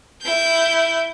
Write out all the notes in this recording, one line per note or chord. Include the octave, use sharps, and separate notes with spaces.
E4 G6